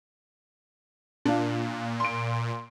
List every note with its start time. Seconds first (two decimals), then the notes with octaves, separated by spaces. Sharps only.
1.25 A#2 D4 F4
2.00 C6 D7